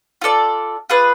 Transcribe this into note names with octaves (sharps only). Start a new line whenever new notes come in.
F4 A4 D5
F4 G#4 B4 D5